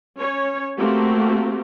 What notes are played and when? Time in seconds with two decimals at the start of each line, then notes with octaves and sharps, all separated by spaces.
0.16 C#4 C#5
0.77 A3 A#3 C4 F#4 G4